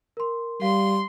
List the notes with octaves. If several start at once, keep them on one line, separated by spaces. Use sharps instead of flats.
A#4 C6
G3 F5 C6